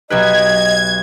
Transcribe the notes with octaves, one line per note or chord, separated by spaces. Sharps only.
B1 G4 B4 D#5 G#6